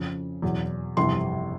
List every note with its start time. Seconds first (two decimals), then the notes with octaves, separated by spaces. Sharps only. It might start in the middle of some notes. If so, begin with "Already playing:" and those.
Already playing: F2 C#3 F3
0.42 E2 B2 F#3
0.97 G1 F2 C3 E3 C6